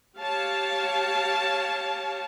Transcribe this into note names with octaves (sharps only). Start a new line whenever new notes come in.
G4 C#5 F5 A5